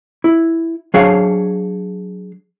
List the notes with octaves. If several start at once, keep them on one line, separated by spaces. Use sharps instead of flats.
E4
F#3 D4 G#4 C#5 F5